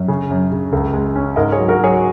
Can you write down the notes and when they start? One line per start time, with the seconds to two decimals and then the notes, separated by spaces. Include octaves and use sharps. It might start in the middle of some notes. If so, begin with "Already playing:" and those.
Already playing: F#2
0.08 C#3 G#4
0.30 F#2
0.52 C#3
0.73 C#2
0.93 G#3
1.16 C#4
1.36 G#2 A#4 D#5
1.52 G#4 C#5
1.57 F#3
1.68 F#4 A#4
1.79 F#3 G#4 C#5